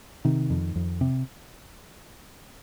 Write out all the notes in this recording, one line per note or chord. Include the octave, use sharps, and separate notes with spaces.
C3 D#3
F2
F2
C3